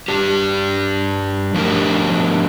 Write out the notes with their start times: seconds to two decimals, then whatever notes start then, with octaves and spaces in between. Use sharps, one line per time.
0.08 G2 E3 G3 D4 G4
1.54 F3 A3 D4 G4 A#4